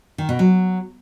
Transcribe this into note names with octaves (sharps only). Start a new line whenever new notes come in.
D#3
B2
F#3